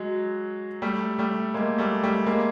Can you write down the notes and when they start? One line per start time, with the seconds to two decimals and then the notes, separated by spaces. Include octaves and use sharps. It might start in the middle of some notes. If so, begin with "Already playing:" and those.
Already playing: F#3 G#3
0.82 G3 A3
1.18 G3 A3
1.54 G#3 A#3
1.78 G3 A3
2.03 G3 A3
2.27 G#3 A#3